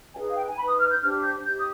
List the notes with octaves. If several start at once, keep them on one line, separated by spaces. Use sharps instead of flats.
D#4 G#4 B4 G#5
F5
G5
G#5
D#4 B4 B5
D#6
F6
G6
D4 G4 C5 F6
G6
D#4 G4 C5 G6
D#6